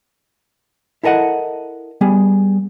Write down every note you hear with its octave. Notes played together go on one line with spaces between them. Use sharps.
E4 A4 A#4 D#5 F#5
G3 B3 G#4